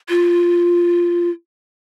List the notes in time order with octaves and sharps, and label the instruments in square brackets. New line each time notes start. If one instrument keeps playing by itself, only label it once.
[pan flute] F4